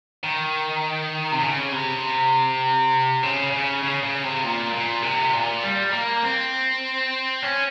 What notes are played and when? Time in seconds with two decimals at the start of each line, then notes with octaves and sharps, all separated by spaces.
0.23 D#3
1.32 C3
1.43 C#3
1.72 C3
3.23 C#3
3.52 C#3
3.83 C#3
4.03 C#3
4.23 C3
4.43 A#2
4.74 A#2
5.03 C3
5.34 A#2
5.63 G3
5.93 A#3
6.23 C4
7.43 C#4